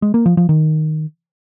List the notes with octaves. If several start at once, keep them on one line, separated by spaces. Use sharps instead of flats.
G#3
A#3
F3
F3
D#3